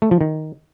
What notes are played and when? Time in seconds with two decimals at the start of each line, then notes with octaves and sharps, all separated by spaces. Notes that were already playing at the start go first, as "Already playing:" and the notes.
0.02 A3
0.11 F3
0.21 D#3